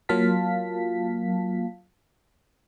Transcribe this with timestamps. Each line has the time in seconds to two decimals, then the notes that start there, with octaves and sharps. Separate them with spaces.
0.09 F#3 A#3 F4 F5 A5 B6